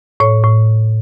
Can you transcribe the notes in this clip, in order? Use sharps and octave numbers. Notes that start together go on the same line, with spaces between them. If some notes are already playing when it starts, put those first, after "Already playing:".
A2 C#5
A2